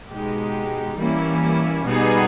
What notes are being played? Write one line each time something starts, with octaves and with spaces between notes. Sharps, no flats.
B2 G#3 D#4 G4
E3 G3 A#3 C#4 E4
B2 G3 B3 D#4 G#4